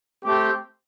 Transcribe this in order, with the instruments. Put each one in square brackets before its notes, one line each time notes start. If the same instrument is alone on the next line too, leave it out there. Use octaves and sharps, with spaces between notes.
[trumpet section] A3 C4 G4